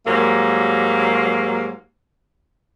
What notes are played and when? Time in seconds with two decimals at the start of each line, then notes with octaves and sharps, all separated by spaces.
0.06 G#2 F#3 G3 A#3